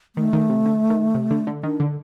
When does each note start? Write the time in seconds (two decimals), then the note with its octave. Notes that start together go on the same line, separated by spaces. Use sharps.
0.16 D#3 A3
0.33 D#3
0.49 C3
0.65 D3
0.90 D#3
1.14 C3
1.31 D3
1.47 D3
1.63 D#3 D4
1.80 D3